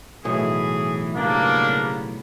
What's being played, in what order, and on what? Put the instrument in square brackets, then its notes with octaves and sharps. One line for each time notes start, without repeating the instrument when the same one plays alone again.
[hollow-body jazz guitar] B1 A2 [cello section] E3 [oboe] G#4
[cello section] C#3 G3 B3 [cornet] A#3 [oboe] D4